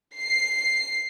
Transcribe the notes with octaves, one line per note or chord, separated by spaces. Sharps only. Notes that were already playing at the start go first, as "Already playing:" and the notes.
C7